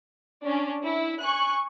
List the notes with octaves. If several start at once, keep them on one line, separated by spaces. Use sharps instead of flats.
C#4 D4
E4
G#5 C#6 F#6